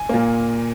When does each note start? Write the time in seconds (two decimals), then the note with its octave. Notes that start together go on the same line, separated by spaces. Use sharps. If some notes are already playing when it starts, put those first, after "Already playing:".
Already playing: G#5
0.09 A#2 A#3